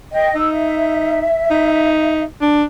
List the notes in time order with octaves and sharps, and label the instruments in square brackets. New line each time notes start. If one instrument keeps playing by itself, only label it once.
[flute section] D#5 G5
[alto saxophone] D#4 [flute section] E6
[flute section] E5
[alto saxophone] D#4
D4